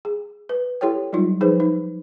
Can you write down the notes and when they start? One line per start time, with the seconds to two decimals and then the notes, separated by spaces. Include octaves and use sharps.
0.05 G#4
0.49 B4
0.81 E4 G4 A4 C#5 G5
1.13 F#3 G3 D#4 F4
1.41 F3 D#4 G#4 B4 C5
1.60 D#4